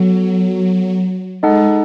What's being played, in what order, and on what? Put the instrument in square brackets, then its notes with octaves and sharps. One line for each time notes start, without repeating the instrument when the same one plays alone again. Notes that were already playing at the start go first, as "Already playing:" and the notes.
Already playing: [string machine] F#3 [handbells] B3 F#4 A4
[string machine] G#3 [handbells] D#4 A4 D#5 F#5 A5